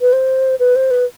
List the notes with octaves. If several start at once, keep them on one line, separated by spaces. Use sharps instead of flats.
B4
C5
B4
C5
B4